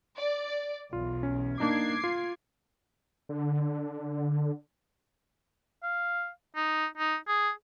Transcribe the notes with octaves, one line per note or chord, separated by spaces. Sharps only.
D5
B1 E2 F4
C#4
A#3 D4 D#4 D6 G#6 C7
F4
D3
F5
D#4
D#4
G#4